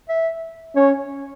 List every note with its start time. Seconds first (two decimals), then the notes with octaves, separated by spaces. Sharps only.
0.09 E5
0.76 C#4 C#5